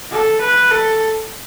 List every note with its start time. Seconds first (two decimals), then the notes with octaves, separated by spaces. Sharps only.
0.11 A4
0.41 B4
0.71 A4